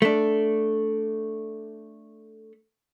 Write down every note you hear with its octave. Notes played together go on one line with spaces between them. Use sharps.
A3 D4